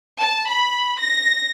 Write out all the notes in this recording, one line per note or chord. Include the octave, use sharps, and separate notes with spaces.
A5
B5
A#6